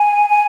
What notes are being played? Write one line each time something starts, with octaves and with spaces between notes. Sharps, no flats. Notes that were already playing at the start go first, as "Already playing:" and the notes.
Already playing: G#5
G#5